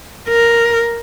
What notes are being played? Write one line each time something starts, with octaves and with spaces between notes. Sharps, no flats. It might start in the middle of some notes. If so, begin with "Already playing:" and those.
A#4